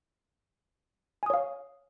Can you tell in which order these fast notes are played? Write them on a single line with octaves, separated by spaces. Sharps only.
G#5 D#6 C#5 F5